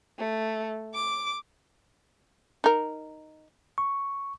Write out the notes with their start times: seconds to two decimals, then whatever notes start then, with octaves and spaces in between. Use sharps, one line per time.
0.19 A3
0.94 D6
2.64 D#4 A#4
3.78 C#6